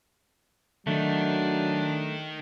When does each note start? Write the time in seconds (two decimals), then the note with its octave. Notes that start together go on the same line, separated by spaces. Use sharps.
0.87 D#3 F#3 A3 D4 D#4